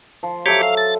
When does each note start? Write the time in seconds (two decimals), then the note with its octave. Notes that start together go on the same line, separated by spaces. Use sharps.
0.23 F3
0.46 F#3 G4 A4 C#5 E5 D6
0.63 F5
0.77 A6